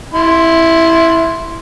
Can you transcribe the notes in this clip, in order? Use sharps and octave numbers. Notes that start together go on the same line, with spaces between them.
E4 C6